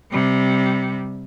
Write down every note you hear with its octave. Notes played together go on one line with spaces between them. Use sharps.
C3 G3